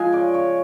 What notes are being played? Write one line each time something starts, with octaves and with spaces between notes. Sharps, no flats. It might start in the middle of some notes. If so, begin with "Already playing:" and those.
Already playing: F3 G#3 G#5
C#3 D5
C#3 C#5